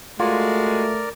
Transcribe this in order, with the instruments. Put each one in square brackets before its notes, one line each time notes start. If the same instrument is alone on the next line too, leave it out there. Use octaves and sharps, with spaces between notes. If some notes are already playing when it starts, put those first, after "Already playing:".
[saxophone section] G#3 F#4 [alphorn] A3 [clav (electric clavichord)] F4 [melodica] A#4 D5